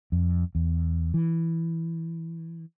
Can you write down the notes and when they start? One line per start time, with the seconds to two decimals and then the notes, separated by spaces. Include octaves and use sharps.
0.12 F2
0.55 E2
1.14 E3